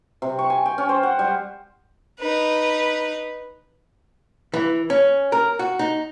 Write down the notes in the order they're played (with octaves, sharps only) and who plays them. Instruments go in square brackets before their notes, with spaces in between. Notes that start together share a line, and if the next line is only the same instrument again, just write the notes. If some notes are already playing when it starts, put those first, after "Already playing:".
[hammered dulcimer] C3
C#6
G#5
G5
C#4
C5
F#5
G3
[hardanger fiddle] D#4 B4
[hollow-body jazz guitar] E3
C#4
A#4
F#4
D#4